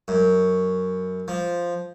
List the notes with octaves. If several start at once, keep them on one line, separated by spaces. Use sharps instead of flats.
F#2
F3